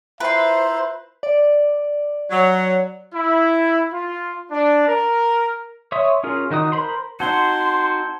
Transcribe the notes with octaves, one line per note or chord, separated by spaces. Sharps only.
E4 F4 B4 C5 E5 A#5 C6
D5
F#3
E4
F4
D4
A#4
C#5 E5 C6 D#6
C#4 F4 G#4 A#4
D#3 D#4 F#4 D#6
A#4 C5 B5 C6
C4 D#4 F#4 A5 C6 G#6 G7